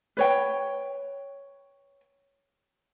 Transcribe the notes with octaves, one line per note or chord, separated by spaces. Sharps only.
B4 C#5 G5